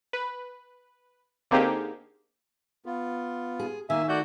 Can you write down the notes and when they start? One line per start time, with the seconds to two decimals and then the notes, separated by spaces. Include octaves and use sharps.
0.13 B4
1.51 D3 A#3 C4 D#4 G4 G#4
2.86 B3 F4
3.59 G#4
3.90 D#3 A#3 E5 G#5
4.09 A3 F#4 D5 G6